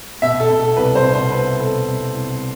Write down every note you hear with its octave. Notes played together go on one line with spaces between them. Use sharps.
B2 E5
A4
B2
A4
C2 B4
C5
B2
C5
C2 B4
B2 A4
C2
C2